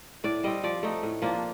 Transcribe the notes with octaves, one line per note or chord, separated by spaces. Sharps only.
A2 D5
G3 C4 D#5
F3 D5
A3 D#4
A2
F3 A#3 D4